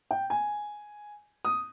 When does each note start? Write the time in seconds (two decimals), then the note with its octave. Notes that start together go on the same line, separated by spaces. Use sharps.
0.11 G5
0.30 G#5
1.45 D#6